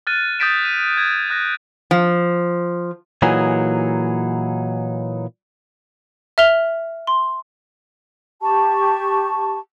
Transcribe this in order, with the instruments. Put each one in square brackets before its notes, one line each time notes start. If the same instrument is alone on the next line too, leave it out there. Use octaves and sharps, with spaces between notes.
[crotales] F6 F#6 A6 D#7
D#6 G6 A6 B6 D7 E7
D#7
G#6
D#6 F#6 A#6
[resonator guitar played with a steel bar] F3
[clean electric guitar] A#2 E3 F#3 D#4 G#4
[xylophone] E5 F6 F7 G7
C6
[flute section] G4 A5 C#6